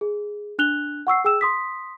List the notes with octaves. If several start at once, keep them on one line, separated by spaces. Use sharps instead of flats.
G#4
D4 F#6 F7 G7
F#5 C#6 E6 C7
G#4 G5 E6 E7
C6 D#6 B6